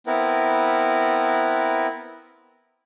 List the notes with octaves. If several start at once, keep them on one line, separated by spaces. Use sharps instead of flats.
B3 C4 E4 A#4 B4